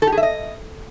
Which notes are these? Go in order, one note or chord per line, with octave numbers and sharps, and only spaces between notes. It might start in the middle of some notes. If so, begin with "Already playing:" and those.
A4
G4
G#4
E5
D#5